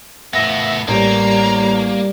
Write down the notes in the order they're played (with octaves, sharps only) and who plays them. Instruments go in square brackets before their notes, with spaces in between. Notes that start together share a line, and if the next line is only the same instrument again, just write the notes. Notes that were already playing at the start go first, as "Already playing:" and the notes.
[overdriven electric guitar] A2 B3 [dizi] E5 [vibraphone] F5 [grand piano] A#6
[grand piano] A1 [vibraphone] G3 G4 D5 [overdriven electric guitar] A#3 [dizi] A#5